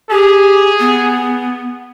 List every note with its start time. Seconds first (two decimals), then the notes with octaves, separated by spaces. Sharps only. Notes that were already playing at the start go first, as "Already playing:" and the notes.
0.10 G4 G#4
0.80 B3